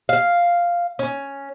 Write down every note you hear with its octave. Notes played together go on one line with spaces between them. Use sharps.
F5
C#4